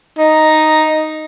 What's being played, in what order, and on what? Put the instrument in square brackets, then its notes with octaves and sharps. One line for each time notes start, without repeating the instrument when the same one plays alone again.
[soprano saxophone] D#4